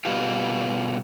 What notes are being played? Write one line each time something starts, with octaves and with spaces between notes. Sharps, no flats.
B2 D3 G3 A#3 F4 G4